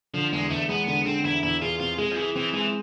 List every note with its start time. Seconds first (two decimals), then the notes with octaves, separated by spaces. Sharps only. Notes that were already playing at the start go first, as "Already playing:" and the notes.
0.14 D3 F3
0.32 E2 G#3
0.50 E2 A3
0.69 G#3 B3
0.87 D3 B3
1.06 D3 C4
1.25 E2 E4
1.43 E2 E4
1.62 F4 G#4
1.80 C4 F4
1.98 G#3 G#4
2.11 F3
2.16 E3 G#4
2.36 E3 C4
2.53 E3 G#3